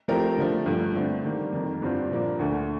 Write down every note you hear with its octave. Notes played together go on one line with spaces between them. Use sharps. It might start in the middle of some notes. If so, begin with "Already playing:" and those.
F3 A3 C4 G4 A#4
D3 F3 A3
G2 F3 A3
D3 A3 C4
D#3 G3 A#3
F2 D#3 A#3
G2 D3 G3 C4 F4
A#2 F3 A#3 D4
D2 D3 A3